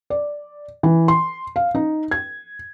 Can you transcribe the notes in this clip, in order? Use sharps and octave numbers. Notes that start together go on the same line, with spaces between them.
D5
E3
C6
F5
D#4
G#6